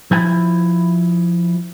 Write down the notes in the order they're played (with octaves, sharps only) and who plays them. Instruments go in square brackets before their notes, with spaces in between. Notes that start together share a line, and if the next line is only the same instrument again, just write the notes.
[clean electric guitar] F3 E4 G#5